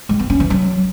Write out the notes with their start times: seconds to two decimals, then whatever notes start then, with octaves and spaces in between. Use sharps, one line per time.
0.09 G#3
0.19 B3
0.30 C#4
0.40 E3
0.50 F#3